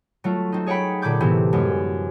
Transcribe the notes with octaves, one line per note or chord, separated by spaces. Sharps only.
F#3 A3 F4
C4 D#4
G#4 C#5 F#5 G5 B5
A#2 D3 B5 D6 G6 G#6
A2 C3 E3 B3 C4
F#2 G#3 B3